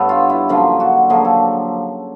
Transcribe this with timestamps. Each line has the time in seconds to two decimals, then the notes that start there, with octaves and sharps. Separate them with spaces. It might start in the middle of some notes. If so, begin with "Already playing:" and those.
Already playing: G2 B3 A4 C#5
0.09 F4
0.30 E4
0.49 F#2 D3 F3 A#3 F4
0.80 F#4
1.09 F#2 D3 F3 A#3 G#4
1.25 A4